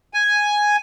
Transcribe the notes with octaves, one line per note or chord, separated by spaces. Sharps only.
G#5